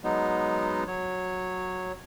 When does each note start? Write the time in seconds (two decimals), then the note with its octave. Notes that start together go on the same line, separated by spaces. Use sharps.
0.04 F#3 G#3 B3 D#4
0.87 F#3 C#5